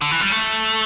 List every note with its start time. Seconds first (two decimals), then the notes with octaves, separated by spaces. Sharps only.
0.01 D3
0.11 E3
0.21 G3
0.31 A3